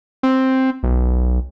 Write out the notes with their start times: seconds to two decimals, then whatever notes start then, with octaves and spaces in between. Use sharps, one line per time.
0.23 C4
0.83 B1